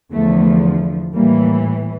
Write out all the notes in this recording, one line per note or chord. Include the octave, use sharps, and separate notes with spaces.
E2 D3 F3 A3
A2 E3 G3 A#3